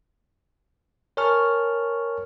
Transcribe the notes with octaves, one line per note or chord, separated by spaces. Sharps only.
A#4 C#5 G#5 A5 C#6 F6